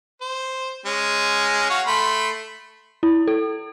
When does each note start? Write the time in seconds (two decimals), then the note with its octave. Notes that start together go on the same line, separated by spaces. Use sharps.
0.21 C5
0.86 G#3 C#4
1.70 F#4 C#5 F5
1.87 A3 B5 C6
3.03 E4
3.27 A4